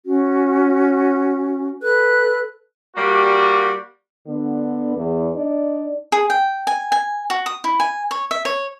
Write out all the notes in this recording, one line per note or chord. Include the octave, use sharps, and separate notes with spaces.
C#4 F#4
A4 B4 F#6
G3 A#3 F#4
D3 B3
E2
D4 D#4 D5
G#4
G5
G#5
G#5
F#4
D#6
E4
G#5
C#5
E5
C#5